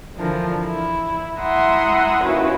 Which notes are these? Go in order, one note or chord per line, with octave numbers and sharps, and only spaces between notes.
D3 E3 F3 D4 A#4
E4
E4 E5 F#5 A#5 C6 D#6
D#2 C#4 E4 F#4 B4